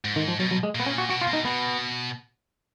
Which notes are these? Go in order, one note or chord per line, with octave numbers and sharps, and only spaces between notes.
G#2
D#3
F3
B2 F#3
F#3
G#3
A#2 B3
C#4
F#4
B2 F#4
F4
B2
D#4
B2 B3